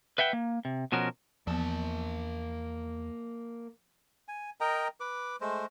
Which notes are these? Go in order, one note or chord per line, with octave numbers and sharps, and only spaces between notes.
B4 E5 F#5 G5
A#3
C3
B2 F3 C#4 F#4 A#4
E2 F3 A#3 B3 A5
G#5
A#4 D#5 G5 A#5
B4 D6
G#3 A3 C5